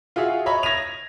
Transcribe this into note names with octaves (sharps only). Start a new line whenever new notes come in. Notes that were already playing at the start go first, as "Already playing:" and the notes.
F4 F#4 G#4 E5 F5
C#5 D#5 E5 A#5 B5
G#6 A#6 B6 D#7 F7